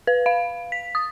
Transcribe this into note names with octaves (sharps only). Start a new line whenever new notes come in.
B4
F5
B6
D#6